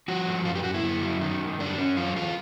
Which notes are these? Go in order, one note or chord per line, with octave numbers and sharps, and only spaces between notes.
F3 F#4
G#2
F#2 F4
G4
F#2 F#4
E4
F#2
F#3
D#3 D#4
F#2
F#2 D4
F#2 C#4
F#3 F4
E2 F4